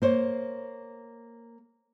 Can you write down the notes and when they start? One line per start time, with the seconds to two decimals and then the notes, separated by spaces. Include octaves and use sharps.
0.02 A#3 C5 C#5